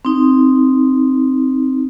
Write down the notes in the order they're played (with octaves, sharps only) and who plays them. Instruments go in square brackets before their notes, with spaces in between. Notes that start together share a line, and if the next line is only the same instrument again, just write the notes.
[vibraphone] C4 D#4